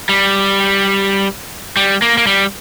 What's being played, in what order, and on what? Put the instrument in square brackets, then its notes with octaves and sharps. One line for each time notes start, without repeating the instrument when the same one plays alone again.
[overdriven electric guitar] G3
G3
A#3
A#3
G3